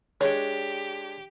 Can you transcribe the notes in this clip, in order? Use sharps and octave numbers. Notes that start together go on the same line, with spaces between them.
G#3 D4 G4 C#5